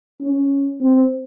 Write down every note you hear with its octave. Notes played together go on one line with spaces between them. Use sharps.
C#4
C4